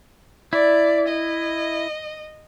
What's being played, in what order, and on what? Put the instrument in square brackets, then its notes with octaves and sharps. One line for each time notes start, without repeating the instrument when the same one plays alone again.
[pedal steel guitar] E4 [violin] D5
[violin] D#5